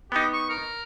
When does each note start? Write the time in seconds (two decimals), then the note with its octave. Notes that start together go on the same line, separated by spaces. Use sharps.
0.12 B3 D#4 G4
0.33 C#6
0.49 A#4